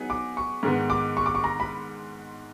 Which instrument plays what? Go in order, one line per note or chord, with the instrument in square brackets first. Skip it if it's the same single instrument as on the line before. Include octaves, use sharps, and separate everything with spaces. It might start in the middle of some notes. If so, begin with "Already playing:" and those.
Already playing: [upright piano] F#3 B3 D#4 G#4
[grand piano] D6
C#6
[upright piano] G#2 D#3 G#3 B3
[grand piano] D6
C#6
D6
C#6
A#5
B5